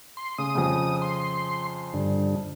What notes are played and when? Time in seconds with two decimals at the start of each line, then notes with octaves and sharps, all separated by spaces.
0.17 C6
0.38 C#3 D#6
0.55 F2 C#3
1.02 C6
1.94 G2 D3